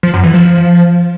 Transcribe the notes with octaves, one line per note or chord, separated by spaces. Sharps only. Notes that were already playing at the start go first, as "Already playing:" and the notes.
F3
F#2
E3
F3